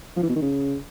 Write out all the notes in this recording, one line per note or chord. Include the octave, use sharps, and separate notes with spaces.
F3
E3
B2
D#3
C#3